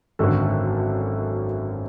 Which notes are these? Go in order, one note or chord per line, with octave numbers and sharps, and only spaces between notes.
G#1 F#2 D3 A4